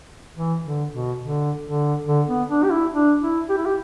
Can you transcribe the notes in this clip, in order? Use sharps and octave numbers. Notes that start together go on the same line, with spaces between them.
E3
D3
B2
D3
D3
D3
B3
D4
G4
E4
D4
E4
G4
E4
G4